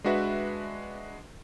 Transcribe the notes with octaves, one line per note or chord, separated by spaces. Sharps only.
G#3 D4 F#4 B4 E5